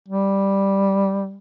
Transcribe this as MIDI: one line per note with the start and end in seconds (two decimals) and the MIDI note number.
0.08 1.37 55